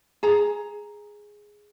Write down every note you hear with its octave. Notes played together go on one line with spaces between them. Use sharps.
G#4 A#5